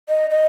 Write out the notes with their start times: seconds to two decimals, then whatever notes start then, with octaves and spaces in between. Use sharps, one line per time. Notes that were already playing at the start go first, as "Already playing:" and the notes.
0.09 D#5
0.30 D#5